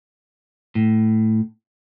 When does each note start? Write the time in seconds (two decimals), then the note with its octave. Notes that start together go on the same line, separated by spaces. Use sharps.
0.75 A2